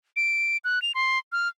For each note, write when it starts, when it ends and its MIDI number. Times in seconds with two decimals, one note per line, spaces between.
0.16 0.57 98
0.64 0.82 90
0.82 0.92 101
0.95 1.19 84
1.32 1.48 89